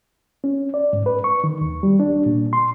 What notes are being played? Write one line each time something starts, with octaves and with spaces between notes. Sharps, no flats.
C#4
D5
G#2
B4
C#6
D#3
D#2
G3
D4
A#2
C6